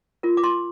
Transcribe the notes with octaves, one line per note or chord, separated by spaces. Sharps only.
F4 A#4
D6
C6